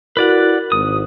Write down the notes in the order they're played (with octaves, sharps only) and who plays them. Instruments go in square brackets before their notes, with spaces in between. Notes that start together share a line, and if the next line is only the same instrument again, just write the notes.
[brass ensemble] E4 F#4 A#4 [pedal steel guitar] B4 D5 F#5
[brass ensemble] G#1 [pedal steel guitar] D#6